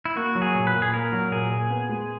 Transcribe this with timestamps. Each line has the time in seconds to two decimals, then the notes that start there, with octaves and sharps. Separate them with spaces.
0.05 E4
0.16 A#3 F#4
0.35 F#3
0.42 G#4
0.55 A#2
0.67 B4
0.74 A#2
0.82 G#4
0.94 A#3 A#4
1.12 F#3
1.31 A#2 G#4
1.50 A#2
1.70 B3
1.89 G#3